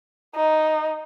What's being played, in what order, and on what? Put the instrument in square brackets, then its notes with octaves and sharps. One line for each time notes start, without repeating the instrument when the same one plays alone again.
[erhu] D#4